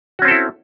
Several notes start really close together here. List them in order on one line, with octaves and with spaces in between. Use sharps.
F#4 C#4 C4 A4 E4